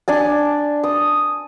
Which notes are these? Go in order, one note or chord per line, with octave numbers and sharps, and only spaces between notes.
D4 G#5 A5
D#6